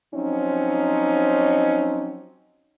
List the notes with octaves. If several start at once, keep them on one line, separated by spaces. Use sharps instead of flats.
F3 F#3 C4 C#4 D#4